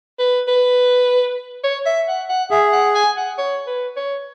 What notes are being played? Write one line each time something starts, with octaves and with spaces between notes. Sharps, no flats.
B4
B4
C#5
E5
F#5
F#5
G#4 E5
F#5
G#5
F#5
C#5
B4
C#5